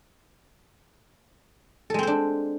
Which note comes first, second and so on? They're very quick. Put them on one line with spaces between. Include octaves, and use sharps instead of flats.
A4 G#3 C4 C5 D4